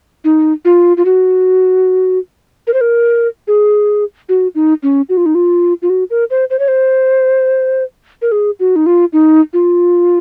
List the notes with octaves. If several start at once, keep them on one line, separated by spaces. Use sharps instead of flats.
D#4
F4
F4
F#4
A#4
C5
A#4
G#4
F#4
D#4
C#4
F#4
F4
D#4
F4
F4
F#4
A#4
C5
C5
C#5
C5
A#4
G#4
F#4
D#4
F4
D#4
F4